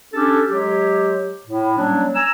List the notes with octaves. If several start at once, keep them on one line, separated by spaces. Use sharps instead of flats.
C#4 D4 G4 A4
F#3 G#3 G4
A2
F#3 G3 A#3 C#4 D4
G#5 A#5 E6